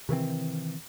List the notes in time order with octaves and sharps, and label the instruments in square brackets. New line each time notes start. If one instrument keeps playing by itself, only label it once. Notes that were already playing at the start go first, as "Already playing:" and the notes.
[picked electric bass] C3 D#3 E3 C4